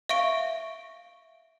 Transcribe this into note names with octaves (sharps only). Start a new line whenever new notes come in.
E5 F5 C#6 D7 G7